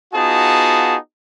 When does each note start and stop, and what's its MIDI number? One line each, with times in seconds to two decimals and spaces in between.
0.14 0.96 59
0.14 0.96 63
0.14 0.96 65
0.14 0.96 66
0.14 0.96 68
0.14 0.96 81